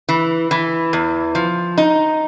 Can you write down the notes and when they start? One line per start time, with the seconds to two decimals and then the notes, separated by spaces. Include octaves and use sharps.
0.09 E3
0.51 E3
0.93 E2
1.35 F3
1.78 D#4